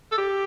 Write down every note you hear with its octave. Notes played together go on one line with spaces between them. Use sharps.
A4
G4